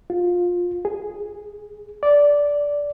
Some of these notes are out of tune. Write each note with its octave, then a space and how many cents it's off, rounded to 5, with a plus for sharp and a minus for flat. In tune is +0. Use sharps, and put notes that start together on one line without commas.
F4 +20
G#4 -5
D5 -10